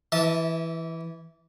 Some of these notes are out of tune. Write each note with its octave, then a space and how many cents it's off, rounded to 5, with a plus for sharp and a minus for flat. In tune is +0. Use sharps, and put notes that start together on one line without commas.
E3 +0 E5 -35 A5 +0